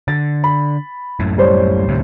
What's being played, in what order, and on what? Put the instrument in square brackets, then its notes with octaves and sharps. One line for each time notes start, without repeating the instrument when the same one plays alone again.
[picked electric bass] D3 [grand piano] A6
[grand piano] B5
[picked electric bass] F#2 A2
[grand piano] G3 C5 C#5
[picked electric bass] D2 A2 C3